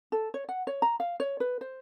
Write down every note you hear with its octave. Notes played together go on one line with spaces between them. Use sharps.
A4
C#5
F#5
C#5
A#5
F5
C#5
B4
C5